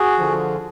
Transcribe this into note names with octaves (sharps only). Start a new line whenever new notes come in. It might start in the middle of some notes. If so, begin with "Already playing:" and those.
Already playing: F#4 G#4
D3 F3